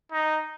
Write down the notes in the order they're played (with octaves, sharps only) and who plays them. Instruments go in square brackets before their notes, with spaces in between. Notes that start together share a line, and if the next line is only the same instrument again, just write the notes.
[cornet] D#4